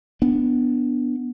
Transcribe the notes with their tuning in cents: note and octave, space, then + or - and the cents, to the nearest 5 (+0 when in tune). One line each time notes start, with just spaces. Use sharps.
B3 +0 D4 +0